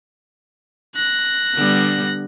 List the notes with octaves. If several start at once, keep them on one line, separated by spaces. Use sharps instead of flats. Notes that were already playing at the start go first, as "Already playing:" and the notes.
F#6 A#6
D3 G3 B3